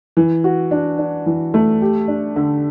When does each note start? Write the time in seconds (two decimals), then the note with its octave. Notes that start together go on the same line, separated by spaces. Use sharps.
0.17 E3
0.44 F#4
0.71 D4
0.98 D4
1.26 E3
1.54 A3
1.82 G4
2.08 D4
2.36 D3